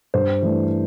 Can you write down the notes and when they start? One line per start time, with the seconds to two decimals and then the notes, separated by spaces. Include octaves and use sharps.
0.14 G2 C5
0.42 E3 A3 D4